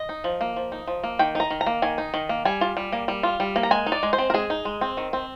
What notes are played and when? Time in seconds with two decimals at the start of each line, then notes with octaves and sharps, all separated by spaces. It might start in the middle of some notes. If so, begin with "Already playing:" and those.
Already playing: D#5
0.09 D#4
0.24 F3
0.41 A#3
0.56 F3
0.72 D#4
0.87 F3
1.04 A#3
1.19 D#3 G5
1.35 D#4 A#5
1.50 D#3
1.61 A#5
1.67 A#3
1.82 D#3 G#5
1.98 D#4
2.14 D#3
2.29 A#3
2.45 G3 G#5
2.61 F4
2.77 G3
2.92 A#3
3.08 G3
3.23 F4
3.40 G3
3.56 A#3
3.63 A#5
3.71 G#3 G#5
3.86 D#4
3.92 D5
4.03 G#3
4.13 C5
4.18 C4
4.30 A#4
4.34 G#3 G#4
4.50 D#4
4.65 G#3
4.81 C4
4.97 D#3
5.13 C4